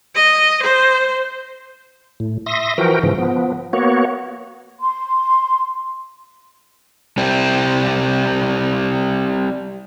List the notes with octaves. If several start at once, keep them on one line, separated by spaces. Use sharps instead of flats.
D#5
C5
A2
E5 C6 D#6 A#6
E3 F3 F#4 A#4 G5
G#2 C#3 E3 F3
F3 B3
A#3 B3 F#4 C#5
C6
G3 C4